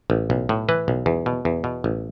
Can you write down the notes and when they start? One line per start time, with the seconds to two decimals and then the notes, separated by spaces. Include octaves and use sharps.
0.10 A1
0.30 B1
0.49 A2
0.69 E3 B4
0.88 B1
1.06 E2
1.26 B2
1.45 E2
1.64 B2
1.84 A1